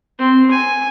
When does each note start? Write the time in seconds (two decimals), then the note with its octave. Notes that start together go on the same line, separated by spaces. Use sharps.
0.19 C4
0.51 G#5